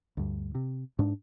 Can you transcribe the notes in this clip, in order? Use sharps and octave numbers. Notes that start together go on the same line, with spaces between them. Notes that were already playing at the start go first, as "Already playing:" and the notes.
D2 G2
C3
G#2 D4